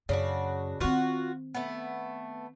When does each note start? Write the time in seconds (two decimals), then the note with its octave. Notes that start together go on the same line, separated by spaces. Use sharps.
0.09 F#2 C#3 D4 F#4
0.80 D#3 C4 F4 F#4
1.55 A3 B3